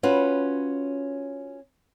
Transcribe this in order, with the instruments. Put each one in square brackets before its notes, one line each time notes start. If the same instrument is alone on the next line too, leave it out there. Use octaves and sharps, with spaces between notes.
[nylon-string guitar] C#4 F4 F#4 B4